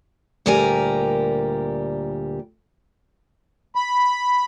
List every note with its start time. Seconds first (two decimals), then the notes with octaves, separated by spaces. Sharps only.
0.46 D2 A#2 G3 G4 A#4 G#5
3.76 B5